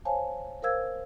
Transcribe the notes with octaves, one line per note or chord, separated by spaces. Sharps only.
C5 C#5 F5 G#5 A5
A#4 C5 F5 E6 G#6